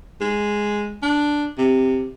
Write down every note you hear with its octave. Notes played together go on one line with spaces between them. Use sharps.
G#3
D4
C3